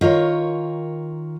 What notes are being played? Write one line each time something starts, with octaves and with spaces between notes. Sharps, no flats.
D#3 F4 A#4 C#5